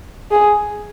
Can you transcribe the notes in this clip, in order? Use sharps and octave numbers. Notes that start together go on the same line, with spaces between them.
G#4